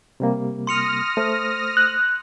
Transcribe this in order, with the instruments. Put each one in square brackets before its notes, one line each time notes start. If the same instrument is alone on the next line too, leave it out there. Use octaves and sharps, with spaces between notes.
[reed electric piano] C3 G3 A#3
[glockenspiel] C6 C#7 F7 [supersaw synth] D#6 F6 A#6
[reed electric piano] A3 C5
[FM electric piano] F#6